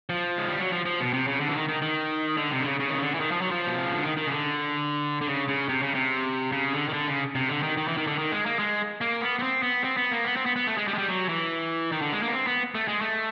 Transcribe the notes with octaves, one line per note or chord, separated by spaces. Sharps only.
F3
G#3
G3
F#3
F3
F3
B2
C3
C#3
D3
E3
D#3
D#3
D#3
D3
C3
D3
C#3
C#3
D#3
D3
E3
D#3
F3
F#3
F3
B2
C3
C#3
D3
D#3
D#3
C#3
D3
D3
C#3
C#3
C3
C#3
C3
C#3
D3
D#3
D3
C#3
C3
D3
D#3
D#3
E3
D#3
D3
D#3
G#3
A#3
G#3
A#3
B3
B3
C4
B3
C4
B3
A#3
B3
C4
B3
B3
A3
G#3
G3
G#3
G3
F#3
E3
D#3
D3
G#3
A#3
B3
C4
B3
A3
G#3
A3